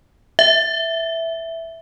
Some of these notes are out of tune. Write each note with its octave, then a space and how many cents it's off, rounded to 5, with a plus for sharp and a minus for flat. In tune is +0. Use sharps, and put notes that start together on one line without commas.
E5 -5